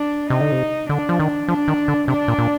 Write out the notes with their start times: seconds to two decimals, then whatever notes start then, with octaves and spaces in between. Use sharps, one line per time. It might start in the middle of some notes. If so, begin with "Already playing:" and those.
Already playing: D4
0.30 C3 D#4
0.41 D3
0.52 C3
0.89 D3 D4
1.09 F3
1.20 D#3
1.48 F3 D4
1.68 D#3
1.88 D3
2.08 C3 D4
2.28 A#2
2.38 A#2